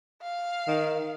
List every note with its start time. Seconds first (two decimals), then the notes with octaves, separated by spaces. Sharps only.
0.23 F5
0.67 D#3